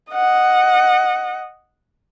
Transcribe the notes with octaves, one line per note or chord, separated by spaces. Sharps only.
D#5 F#5